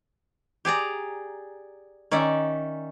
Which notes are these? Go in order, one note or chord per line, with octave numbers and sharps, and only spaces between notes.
G4 G#4 D5 A#5
D#3 C#4 D5 E5